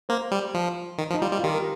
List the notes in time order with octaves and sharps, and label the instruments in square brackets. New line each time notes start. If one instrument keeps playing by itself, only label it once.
[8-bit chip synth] A#3 [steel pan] C5
[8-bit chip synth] G3
F3
D#3
F3
[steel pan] D#4
[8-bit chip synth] G3 [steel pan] F4
[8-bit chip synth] G3
[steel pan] F4
[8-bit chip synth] D#3 [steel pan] G4
[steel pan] A#4